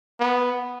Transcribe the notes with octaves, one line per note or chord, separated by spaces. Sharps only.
B3